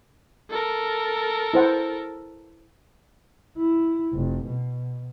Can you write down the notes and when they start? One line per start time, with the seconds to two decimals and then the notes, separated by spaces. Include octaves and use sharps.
0.50 A4 A#4
1.54 E4 C5 F#5
3.58 E4
4.14 F1
4.47 B2